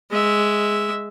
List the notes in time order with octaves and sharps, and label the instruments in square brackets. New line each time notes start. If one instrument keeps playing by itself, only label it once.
[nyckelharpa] G#3 E5